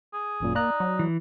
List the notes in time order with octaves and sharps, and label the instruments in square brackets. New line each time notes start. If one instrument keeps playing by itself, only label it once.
[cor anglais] G#4
[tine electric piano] G#1 F#2 A#2
[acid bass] A#3 [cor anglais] D#4 [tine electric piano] D5 A#5 F#6
[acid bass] F#3
[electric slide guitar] E3